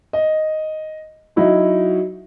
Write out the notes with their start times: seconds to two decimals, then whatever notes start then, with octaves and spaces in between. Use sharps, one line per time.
0.13 D#5
1.36 F#3 D#4 E4 F#4